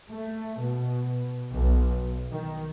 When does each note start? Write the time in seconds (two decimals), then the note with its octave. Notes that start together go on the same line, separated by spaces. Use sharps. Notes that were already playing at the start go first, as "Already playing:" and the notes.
0.10 A3
0.62 B2
1.53 B1
2.31 D#3